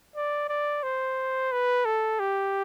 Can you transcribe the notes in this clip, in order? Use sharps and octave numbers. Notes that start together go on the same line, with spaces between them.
D5
D5
C5
B4
A4
G4